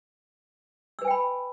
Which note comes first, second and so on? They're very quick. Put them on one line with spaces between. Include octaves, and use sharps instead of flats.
E6 B4 G#5 G5 B5